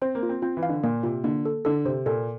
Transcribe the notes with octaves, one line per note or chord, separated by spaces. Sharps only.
C4 C5
A#3
F4
C4
C4 F4
E3
F5
D3
A#2 A#3
C3 F4
D3 A#3
A4
D3 A4
C3 C5
A#2 A4